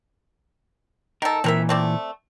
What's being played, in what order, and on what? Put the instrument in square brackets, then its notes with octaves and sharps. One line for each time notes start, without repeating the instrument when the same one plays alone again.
[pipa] D#3 A4 [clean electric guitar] A#4
[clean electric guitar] A#2 E3 [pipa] C4 A#4 E5
[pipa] A3 C4 D5